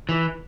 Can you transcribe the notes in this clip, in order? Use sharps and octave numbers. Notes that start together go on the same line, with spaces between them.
E3